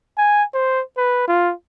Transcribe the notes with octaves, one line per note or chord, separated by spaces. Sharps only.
G#5
C5
B4
F4